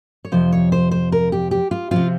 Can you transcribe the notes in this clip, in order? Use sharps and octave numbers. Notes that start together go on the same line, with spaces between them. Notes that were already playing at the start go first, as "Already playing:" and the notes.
C#5
F2 C3 F3 C5
C#5
C5
C5
A#4
G4
G4
F4
C3 F3 C4 F4